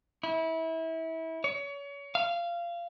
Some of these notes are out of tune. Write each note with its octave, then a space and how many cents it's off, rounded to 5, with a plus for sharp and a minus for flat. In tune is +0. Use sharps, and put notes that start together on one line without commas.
E4 -25
C#5 +30
F5 -20